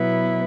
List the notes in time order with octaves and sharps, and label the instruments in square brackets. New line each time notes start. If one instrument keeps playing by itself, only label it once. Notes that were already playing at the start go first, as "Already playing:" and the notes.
Already playing: [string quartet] B2 F#3 B3 E4